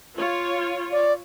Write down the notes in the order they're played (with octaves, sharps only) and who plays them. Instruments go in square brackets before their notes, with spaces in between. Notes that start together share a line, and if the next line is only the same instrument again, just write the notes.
[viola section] F4 C#5
[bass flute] D5